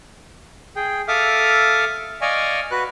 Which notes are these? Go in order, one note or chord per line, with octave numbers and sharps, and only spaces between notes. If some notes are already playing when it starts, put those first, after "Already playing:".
G#4 G5
A4 E5 F5 D6 D#6 F6
D5 D#5 F5 G#5 C#6
F#4 B4 F#6